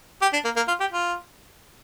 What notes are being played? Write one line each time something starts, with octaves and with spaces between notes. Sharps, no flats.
G4
D4
A#3
A#3
F4
G4
F4